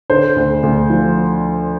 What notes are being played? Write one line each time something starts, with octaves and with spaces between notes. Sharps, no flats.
D3 C5
D2
D2
F3